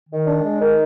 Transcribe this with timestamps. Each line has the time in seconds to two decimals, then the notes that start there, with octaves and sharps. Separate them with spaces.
0.09 D#3
0.26 D4
0.43 G#3
0.60 D#3